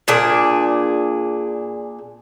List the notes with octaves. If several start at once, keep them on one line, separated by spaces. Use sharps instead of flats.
A#2 D4 G#4